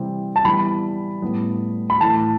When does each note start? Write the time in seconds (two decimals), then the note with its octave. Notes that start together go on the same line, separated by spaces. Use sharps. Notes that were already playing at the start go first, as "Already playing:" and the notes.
Already playing: C3 E3 G3 C4
0.36 A5
0.45 E3 G3 B3 B5
1.22 A2 G3 B3
1.90 B5
2.00 A2 E3 A3 A5